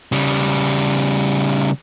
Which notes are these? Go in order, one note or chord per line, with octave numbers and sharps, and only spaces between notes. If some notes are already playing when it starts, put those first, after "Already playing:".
C#3 G3